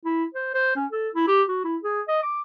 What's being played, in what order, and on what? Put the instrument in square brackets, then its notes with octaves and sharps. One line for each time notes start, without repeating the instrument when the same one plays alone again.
[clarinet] E4
C5
C5
C#4
A4
E4
G4
F#4
E4
G#4
D#5
D6